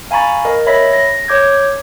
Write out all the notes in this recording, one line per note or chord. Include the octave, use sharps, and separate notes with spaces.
F5 G#5 A#5 B5 C#6 A6
A#4 D#5
C#5 E5 B5 A#6 B6
A#6
C#5 D6 G6 G#6